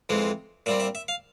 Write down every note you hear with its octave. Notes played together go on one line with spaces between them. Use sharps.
F2 E3 G#3 C4
A#2 G3 C4 E5
E5
E5
F5